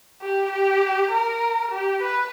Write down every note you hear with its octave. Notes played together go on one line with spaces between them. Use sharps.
G4
G4
A#4
G4
B4